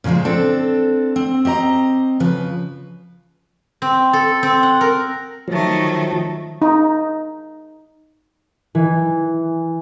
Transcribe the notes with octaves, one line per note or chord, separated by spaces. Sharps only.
A#2 C#3 E3 F3 G#3
C4 D4 A4
C4
C4 G4 D#5 A#5
C#3 F3 B4
C4
A4
C4
F#5
A#4
D#3 F3 F#3 A3
D#4
E3